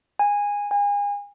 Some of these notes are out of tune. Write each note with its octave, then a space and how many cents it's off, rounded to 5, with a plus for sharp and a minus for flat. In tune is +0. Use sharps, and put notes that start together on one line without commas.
G#5 -20
G#5 -35